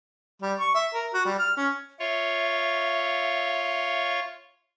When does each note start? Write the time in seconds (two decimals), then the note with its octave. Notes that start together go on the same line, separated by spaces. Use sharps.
0.42 G3
0.60 C#6
0.75 E5
0.94 A#4
1.14 F#4
1.25 G3
1.39 F6
1.57 C#4
2.00 F4 C#5 E5